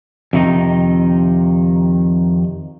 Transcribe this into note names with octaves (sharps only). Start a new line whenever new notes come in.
F2 C3 D#3 D#4